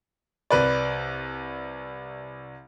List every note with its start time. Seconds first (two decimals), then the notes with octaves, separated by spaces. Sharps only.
0.50 C2 B4 D5